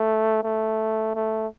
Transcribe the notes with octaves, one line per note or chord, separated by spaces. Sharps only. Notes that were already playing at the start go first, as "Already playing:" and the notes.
Already playing: A3
A3
A3